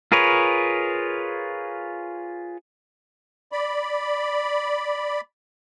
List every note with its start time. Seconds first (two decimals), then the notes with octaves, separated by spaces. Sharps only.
0.12 F4 G#4 A#4 B4 C#5
3.52 D5 B5